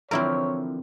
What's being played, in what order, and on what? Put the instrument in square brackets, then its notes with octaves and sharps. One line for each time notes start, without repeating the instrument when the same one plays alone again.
[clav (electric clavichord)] D3 E3 F3 [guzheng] C4 E4 A#4 [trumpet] C#5